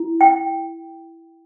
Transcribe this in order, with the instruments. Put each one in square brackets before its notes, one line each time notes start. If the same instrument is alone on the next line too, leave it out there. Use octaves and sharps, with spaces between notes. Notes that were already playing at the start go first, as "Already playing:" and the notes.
Already playing: [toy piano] E4
G5